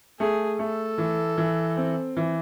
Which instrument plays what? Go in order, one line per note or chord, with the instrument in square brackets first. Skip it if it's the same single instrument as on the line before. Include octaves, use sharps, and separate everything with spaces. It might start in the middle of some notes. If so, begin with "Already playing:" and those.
[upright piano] A3 [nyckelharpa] G#4
[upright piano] A3 [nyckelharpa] A4
[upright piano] E3
E3
C4
E3